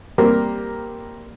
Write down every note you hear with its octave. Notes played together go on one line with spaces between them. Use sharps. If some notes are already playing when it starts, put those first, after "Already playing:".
G3 A#3 C4 G4 A#4